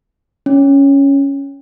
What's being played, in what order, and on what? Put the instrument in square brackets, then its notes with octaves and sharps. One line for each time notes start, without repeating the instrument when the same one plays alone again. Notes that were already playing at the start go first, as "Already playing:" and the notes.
[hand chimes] C#4